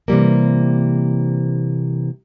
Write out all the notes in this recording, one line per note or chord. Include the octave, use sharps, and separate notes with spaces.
C3 E3 G3 A#3